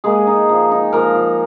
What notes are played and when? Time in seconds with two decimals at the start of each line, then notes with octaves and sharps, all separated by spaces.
0.04 G#3 A#3 G#4
0.27 D#4
0.49 F3
0.71 D#4
0.93 F3 A#3 A#4
1.16 F3